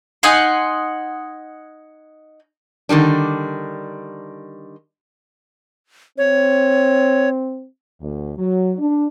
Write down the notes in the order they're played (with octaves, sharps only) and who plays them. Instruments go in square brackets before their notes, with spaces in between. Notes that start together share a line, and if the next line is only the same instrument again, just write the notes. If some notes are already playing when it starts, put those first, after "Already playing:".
[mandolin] D#4 F#5 G#5 C6
[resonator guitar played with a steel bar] D3 D#3 G3 D4
[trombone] C4 [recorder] C#5
[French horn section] D2
F#3
D4